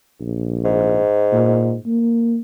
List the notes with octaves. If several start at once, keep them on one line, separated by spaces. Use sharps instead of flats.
A#1
G#2
A#2
A#3